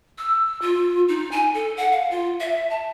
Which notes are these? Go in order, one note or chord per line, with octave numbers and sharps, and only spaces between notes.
E6
F4
D#4
G#5
A4
F#5
F5
F4
E5
A5